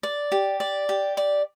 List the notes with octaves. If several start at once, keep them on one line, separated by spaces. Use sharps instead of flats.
D5
G4
D5
G4
D5